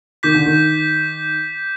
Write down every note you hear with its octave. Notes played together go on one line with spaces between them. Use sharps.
D#3 D6 G6 B6
D3
D#3